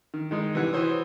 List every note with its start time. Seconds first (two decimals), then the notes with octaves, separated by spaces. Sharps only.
0.14 D#3
0.31 D#3 G#3 D#4
0.54 C3 E3 G3 E4 F#5
0.73 E3 F#4 C5 C#5 D#6